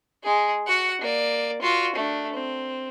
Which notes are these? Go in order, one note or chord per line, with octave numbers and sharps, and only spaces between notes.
G#3 G#4
F#4 F#5
A#3 D5
F4 F#4
A3 D4
C4